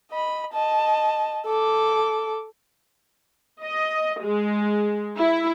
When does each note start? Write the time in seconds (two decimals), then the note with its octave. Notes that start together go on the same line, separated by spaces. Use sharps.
0.11 D#5 B5
0.53 D#5 A5
1.46 A4 D6
3.63 D#5
4.23 G#3
5.18 E4